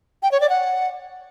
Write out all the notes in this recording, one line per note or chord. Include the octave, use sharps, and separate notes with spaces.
G5
C#5
D5
F#5